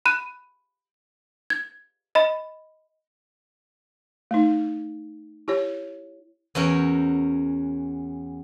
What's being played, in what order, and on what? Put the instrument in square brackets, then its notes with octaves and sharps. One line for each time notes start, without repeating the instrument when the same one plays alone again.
[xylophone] B5 F#6 D#7
G#6
D#5 B5
[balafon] A3 D#4
E4 G4 C#5
[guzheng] E2 C#4 F#4 A#4 G5